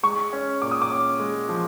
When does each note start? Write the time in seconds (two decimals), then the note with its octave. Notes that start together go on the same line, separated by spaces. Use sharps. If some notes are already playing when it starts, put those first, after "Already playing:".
0.03 G#3 C#6
0.33 C#4
0.62 A#2 D6
0.71 D#6
0.82 D6
0.90 C#4
1.20 G#3
1.49 F3